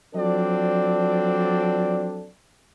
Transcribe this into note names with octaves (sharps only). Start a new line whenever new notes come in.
F3 F#3 C4 D4 A4 D5